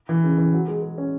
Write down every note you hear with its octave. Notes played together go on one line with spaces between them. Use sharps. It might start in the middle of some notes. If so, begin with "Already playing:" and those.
E3
C#3
E3
F#3
G#3
G#3
C#4